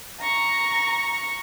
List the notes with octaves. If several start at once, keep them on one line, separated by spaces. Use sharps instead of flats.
A#5 C#6